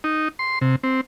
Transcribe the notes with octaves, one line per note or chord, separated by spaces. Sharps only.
D#4
C6
C3
C4